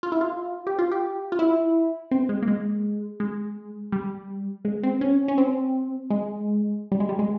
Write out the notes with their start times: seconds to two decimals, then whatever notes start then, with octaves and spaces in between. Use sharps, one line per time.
0.03 F4
0.12 E4
0.21 F4
0.67 G4
0.79 F4
0.91 G4
1.32 F4
1.39 E4
2.11 C4
2.29 G#3
2.42 A#3
2.48 G#3
3.20 G#3
3.92 G3
4.65 G#3
4.83 C4
5.01 C#4
5.28 C#4
5.38 C4
6.10 G#3
6.92 G3
7.00 G#3
7.09 G3
7.19 G#3